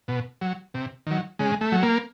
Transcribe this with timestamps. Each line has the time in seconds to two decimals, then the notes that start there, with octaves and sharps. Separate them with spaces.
0.08 B2
0.41 F#3
0.74 C3
1.07 D#3 F#3
1.39 C#3 G#3
1.61 A3
1.72 F#3
1.83 A#3